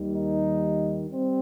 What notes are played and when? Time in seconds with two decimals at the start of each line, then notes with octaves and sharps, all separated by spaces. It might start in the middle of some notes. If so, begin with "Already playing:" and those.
Already playing: D#2 D#3 G3
0.14 D#4
1.10 G3 C4